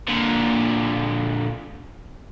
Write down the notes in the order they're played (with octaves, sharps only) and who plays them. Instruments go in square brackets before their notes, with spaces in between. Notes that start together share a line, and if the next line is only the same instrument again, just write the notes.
[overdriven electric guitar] A#2 D3